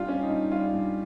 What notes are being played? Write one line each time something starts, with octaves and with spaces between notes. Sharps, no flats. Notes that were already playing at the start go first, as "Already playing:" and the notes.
Already playing: G2 G3 F4 G4
C#4
D#4
G2
G3 F4
G2